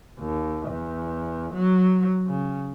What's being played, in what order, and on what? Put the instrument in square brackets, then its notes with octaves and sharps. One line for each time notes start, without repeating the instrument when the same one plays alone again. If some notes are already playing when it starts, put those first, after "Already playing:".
[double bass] D#2
E2
F#3
C#3